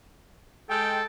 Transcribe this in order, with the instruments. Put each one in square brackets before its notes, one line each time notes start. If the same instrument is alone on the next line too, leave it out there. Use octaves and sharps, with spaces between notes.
[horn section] G#3 G5 [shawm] A4